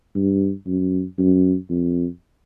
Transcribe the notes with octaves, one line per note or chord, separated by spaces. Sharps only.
G2
F#2
F#2
F2